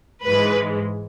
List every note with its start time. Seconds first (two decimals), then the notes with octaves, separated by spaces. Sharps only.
0.25 G#2 E3 G#3 B4